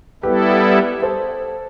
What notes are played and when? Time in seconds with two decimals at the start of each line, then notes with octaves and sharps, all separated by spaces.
0.23 G3 B3 E4 G4 A4 B4
1.02 A4 C5